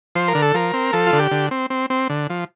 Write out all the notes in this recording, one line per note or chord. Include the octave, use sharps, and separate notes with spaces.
F3 C5
A#4
D3
A4
F3 A#4
C4
F3 A4
F4
D3
G4
D3
C4
C4
C4
D3
F3